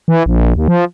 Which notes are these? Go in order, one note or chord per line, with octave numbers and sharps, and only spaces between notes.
E3
A#1
D#2
F3